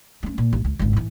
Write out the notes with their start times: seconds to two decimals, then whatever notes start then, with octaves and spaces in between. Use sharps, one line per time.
0.23 A3 C#4
0.38 A#2
0.53 A1
0.65 C#2
0.79 G#1 C#2
0.93 A2 E3